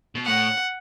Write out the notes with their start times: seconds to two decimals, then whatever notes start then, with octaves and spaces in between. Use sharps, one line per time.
0.15 B2
0.26 A2 F#5